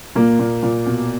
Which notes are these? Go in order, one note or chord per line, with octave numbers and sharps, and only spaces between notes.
A#2 A#3
A#2
A#2
B2